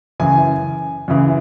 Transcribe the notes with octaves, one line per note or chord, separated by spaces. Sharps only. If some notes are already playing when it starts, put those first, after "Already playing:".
F#2 C#3 E3 G#5
F#2 C#3 E3